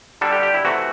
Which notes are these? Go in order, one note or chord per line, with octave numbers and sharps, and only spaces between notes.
D3 G3 D4 A4
G4
G4
E4
C3 E3 A3 F#4